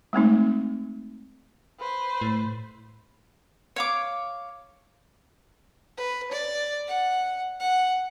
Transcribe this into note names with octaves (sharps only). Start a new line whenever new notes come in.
G#3 A3 C4 D#4
B4 C5
A2
C#5 F5 D6
B4
D5
F#5
F#5